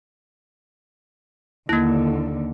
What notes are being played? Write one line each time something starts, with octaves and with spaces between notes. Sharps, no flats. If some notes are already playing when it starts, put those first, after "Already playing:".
D#2 D3 A#3 E4